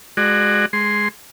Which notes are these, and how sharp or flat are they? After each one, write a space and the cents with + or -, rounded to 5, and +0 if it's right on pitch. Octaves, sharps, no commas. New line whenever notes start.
G#3 +0 F#4 +0 D5 +35
G#3 +0 C6 +0